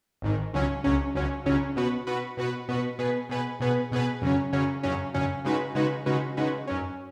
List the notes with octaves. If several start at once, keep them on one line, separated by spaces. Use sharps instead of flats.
G#1 G#2 D#3
C#2 C#3 F#3 C#4
C#2 C#3 F#3 C#4
C#2 C#3 F#3 C#4
C#2 C#3 F#3 C#4
B2 B3 F#4 B4
B2 B3 F#4 B4
B2 B3 F#4 B4
B2 B3 F#4 B4
B2 B3 G#4 B4
B2 B3 G#4 B4
B2 B3 G#4 B4
B2 B3 G#4 B4
F#2 C#3 F#3 C#4
F#2 C#3 F#3 C#4
F#2 C#3 F#3 C#4
F#2 C#3 F#3 C#4
C#3 G#3 D#4 F#4 B4
C#3 G#3 D#4 F#4 B4
C#3 G#3 D#4 F#4 B4
C#3 G#3 D#4 F#4 B4
F#2 F#3 C#4